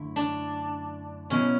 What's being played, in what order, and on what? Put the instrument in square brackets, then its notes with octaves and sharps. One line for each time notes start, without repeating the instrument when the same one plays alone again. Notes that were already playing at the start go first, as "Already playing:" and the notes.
Already playing: [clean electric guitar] F#2 D3 A3 E4
[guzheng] D4
[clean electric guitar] B2 F#3 B3 E4 [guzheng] C#4